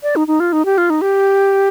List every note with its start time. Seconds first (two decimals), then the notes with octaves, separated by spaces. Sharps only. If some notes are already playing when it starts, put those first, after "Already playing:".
0.03 D5
0.16 D#4
0.28 D#4
0.40 F4
0.53 D#4
0.65 G4
0.78 F4
0.90 D#4
1.01 G4